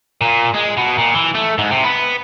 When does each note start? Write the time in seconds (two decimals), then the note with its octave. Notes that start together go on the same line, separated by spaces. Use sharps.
0.21 A#2
0.55 G#3
0.77 B2
0.98 A#2
1.14 E3
1.35 A3
1.58 G#2
1.71 C3
1.84 B3